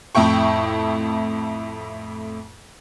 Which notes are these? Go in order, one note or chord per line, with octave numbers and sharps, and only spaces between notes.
F2 A2 E4 G5 C#6